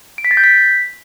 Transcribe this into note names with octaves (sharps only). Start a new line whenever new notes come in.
D7
B6
A6
G6
B6